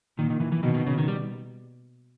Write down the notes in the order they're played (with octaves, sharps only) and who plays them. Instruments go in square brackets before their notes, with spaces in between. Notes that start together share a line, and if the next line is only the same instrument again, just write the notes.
[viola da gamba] A#2 [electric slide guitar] D#3
[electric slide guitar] D#3
E3
E3
[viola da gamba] B2 [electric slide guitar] D#3
[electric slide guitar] D#3
C#3
D#3
G3